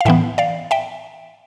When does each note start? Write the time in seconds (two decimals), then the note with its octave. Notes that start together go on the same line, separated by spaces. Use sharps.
0.01 F5
0.05 A2 E3 B3 E5 G5
0.38 D5 F5
0.71 E5 G5